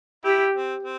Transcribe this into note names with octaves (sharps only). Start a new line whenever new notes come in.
E4 G4
C4
C4